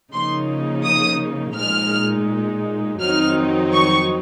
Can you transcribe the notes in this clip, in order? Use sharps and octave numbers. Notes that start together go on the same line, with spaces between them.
C#3 F3 A#3 D#4 C6
D#6
A#2 G#3 D#4 F6
F2 D#3 F#3 C4 D#4 F6
C#6